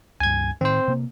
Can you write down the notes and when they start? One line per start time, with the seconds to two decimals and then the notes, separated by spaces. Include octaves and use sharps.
0.20 C#2 G2 G#5 G#6
0.61 A2 D#3 C4 C5
0.88 C3 A#3